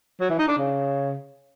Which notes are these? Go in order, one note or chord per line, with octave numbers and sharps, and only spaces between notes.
F#3
E3
D#4
D4
C#3